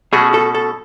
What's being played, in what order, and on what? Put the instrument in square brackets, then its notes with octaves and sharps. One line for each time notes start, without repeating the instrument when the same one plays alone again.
[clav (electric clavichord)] B2 A3 C#4 F#4 [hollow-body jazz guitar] G#4
[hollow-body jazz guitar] A4
A4